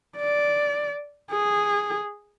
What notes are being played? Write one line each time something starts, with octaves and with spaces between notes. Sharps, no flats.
D5
G#4